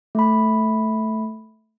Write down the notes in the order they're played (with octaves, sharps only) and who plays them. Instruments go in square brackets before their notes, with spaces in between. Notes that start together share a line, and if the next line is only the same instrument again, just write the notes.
[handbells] A3 B5